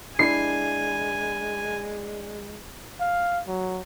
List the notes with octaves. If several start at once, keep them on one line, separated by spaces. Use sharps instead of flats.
G#3 D4 E4 G#5 B5 C7
F5
F#3